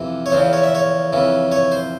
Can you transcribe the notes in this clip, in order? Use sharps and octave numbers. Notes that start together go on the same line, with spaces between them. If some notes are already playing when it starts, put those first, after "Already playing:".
Already playing: F2 C3 E3
C#5
E2 C#3 F3 C5
C#5
E5
C#5
F2 C#3 E3
C#5
C5